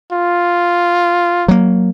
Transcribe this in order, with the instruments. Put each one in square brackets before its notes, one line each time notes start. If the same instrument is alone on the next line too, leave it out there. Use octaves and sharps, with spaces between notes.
[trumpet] F4
[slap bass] F#3 A#3